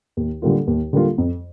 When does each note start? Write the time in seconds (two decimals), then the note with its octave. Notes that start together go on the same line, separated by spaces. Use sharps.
0.17 D#2
0.42 D3 G3 A#3 F4
0.67 D#2
0.93 D3 G3 A#3 F4
1.18 F2